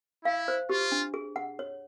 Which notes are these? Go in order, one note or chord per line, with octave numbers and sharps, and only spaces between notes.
E4 F5
C5
F4 G4
D4
G#4
F#5
C#5